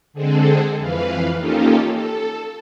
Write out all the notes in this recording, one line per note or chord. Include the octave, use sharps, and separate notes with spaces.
D3 G#3 C4 G#4 A4
F2 E3 B4 F5
A#3 C#4 D#4 F4 G4 A4
A4